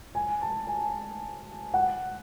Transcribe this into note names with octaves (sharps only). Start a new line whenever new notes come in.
G#5
A5
G#5
F#5